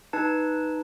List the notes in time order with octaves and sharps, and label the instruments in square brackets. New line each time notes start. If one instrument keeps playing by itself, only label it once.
[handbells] D#4 B4 A5